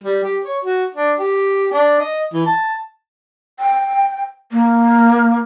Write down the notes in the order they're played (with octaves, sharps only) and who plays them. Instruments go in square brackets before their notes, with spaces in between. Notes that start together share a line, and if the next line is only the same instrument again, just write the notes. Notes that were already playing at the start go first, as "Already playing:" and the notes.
[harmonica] G3
G4
C#5
F#4
D4
G4
D4
D#5
E3
A5
[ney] G5
A#3